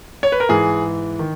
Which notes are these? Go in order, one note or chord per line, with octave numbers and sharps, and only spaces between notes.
C#5
B4
A#4
G#2 E3 G#4
D#3